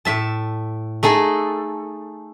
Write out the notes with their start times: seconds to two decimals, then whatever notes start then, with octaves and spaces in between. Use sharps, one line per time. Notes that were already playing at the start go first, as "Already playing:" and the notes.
0.05 A2 E5 A5
1.03 A3 D#4 G#4 A4